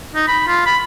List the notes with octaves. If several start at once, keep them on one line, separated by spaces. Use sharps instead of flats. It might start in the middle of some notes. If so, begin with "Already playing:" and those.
D#4
B5
F4
B5